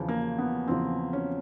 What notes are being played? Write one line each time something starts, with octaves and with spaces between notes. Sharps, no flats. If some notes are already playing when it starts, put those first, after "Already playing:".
Already playing: E2 C#3 F3
A#3
B3
E2 C#3 F3 C4
C#4